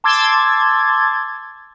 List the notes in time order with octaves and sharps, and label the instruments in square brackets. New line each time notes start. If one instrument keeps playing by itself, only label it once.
[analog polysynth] A5 C6 D6 E6 G#6 A6